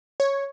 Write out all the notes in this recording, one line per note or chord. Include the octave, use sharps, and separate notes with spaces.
C#5